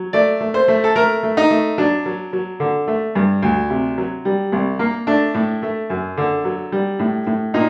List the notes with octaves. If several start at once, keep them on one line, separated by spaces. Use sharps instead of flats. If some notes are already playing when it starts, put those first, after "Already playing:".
Already playing: F#3
A3 D5
A3
C5
A3
A4
A3 A#4
A3
D#4
A3
F#3 D4
F#3
F#3
D3
A3
G2
D2
C3
F#3
G3
C2
A#3
A3 D4
A2
A3
F#2
D3
F#3
G3
A2
A2
A#2 D#4